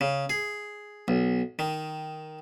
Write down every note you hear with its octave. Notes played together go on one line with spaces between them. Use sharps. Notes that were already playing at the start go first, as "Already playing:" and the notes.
C#3
G#4
B1
D#3